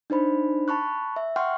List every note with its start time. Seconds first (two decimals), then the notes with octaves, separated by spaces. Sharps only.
0.10 D4 D#4 C5 B5
0.68 A5 B5 C#6 F#6
1.16 E5
1.36 F#5 G5 C6 C#6 F6